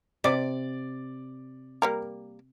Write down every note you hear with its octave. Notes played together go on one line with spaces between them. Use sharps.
C3 D5 D6
G3 A#3 A#4